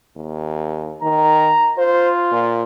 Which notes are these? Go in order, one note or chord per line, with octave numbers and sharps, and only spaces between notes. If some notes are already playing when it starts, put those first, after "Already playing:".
D#2
D#3 A#5
F4 C5
A#2